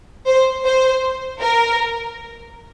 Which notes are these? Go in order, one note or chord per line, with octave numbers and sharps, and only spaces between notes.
C5
C5
A#4